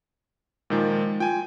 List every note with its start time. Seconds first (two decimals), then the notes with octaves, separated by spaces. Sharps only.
0.70 A#2 D#3 F3 G#3
1.20 F4 G5 G#5